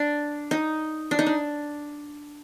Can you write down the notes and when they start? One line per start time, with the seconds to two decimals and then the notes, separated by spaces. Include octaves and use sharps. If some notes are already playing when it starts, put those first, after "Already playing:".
Already playing: D4
0.51 D#4
1.11 D4
1.19 D#4
1.26 D4